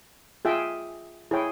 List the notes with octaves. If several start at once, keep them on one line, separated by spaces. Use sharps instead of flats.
F4 G#4 E5 G5
E4 G#4 C#5 G5